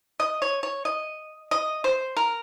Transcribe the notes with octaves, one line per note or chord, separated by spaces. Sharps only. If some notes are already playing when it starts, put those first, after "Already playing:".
D#5
C#5
C#5
D#5
D#5
C5
A#4